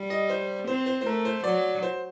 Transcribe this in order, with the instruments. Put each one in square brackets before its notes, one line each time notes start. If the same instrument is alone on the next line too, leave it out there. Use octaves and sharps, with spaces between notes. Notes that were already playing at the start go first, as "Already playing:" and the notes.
Already playing: [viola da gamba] G3
[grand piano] D#5
C5
[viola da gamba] C4 [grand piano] C5
[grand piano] C5
C5
[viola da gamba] A3 [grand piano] A#4
[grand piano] C5
[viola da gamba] F#3 [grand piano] D5
[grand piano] C5